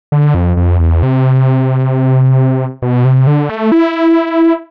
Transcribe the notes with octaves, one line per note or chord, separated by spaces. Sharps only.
D3
F2
F2
E2
C3
B2
C3
D3
A3
E4